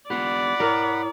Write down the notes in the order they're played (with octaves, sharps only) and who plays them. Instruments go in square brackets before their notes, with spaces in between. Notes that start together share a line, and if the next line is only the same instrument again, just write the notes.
[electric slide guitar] B3 F4 G4 [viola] D5 [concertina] F#5 B5
[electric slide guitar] E4 C#5 [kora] A#4